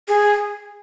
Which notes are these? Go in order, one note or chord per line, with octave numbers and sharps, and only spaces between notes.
G#4